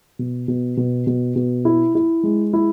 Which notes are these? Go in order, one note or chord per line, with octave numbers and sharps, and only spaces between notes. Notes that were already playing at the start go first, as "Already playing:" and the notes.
B2
B2
B2
B2
B2
E4
E4
G#3
E4